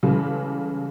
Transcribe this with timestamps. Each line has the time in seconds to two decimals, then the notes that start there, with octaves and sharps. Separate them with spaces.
0.03 C#3 E3 G3 G#3 G4 A4